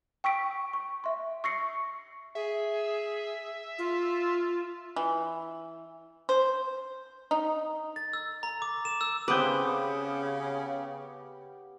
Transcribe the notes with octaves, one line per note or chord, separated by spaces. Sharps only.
G5 C#6 E6 B6 D7
C#6
E5 C6
C#6 E6 A#6 C7 C#7
G#4 E5
F4
E3
C5
D#4
A6
E6
A#5
D6
E7
E6
C#3 B3 C4 G4 B4 D6 D#6 G6